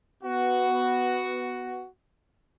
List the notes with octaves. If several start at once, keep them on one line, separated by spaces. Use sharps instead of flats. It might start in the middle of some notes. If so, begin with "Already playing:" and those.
B3 F#4